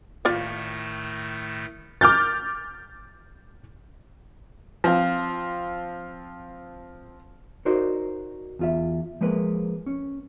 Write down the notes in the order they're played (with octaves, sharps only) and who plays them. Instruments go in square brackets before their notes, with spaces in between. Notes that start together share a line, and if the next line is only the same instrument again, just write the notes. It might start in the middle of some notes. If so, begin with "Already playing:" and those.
[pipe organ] A2 D#3 A3 [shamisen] F4 D5 F5
[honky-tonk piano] D6 F6 G6 A6
[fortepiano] F3 C4 F4
[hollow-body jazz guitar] D#4 F#4 A#4 C5 D5 D#5
E2 F4 E5
F3 G#3 A#3 B4
C#4